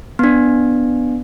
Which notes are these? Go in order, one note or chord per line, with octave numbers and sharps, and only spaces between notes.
B3 D4